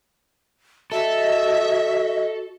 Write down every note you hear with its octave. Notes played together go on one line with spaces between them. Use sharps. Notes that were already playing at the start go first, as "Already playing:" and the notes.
F#4 A4 D#5 E5